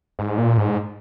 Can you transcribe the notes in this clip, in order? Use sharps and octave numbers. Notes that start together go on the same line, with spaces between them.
G#2
A#2
G#2